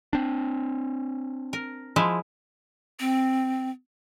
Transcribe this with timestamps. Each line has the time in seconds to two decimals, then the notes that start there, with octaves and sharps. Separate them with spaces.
0.13 C4 D4
1.53 A#4
1.96 F3 G#3 E4
3.00 C4